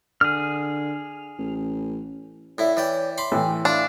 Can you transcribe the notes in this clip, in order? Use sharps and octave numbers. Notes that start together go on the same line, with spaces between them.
D3 G#4 F6
A1
A2 E4 D5
E3 C#5 D5 G5
B5 C6 D6
A2 E3 G5
D4 F4 E5